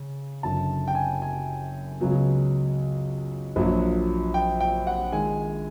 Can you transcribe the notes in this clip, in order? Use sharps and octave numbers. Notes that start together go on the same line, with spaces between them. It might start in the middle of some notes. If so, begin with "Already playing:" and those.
Already playing: C#3
F#1 F#2 D3 A5
G5
G#5
G#5
C#2 C#3 F#3 B3
A#1 A#2 F#3
G5
G5
F#5
D#3 G#3 G#5